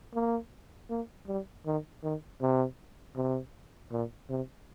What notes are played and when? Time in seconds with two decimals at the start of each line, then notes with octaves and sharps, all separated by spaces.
0.14 A#3
0.90 A#3
1.27 G3
1.66 D#3
2.03 D#3
2.41 C3
3.16 C3
3.92 A#2
4.30 C3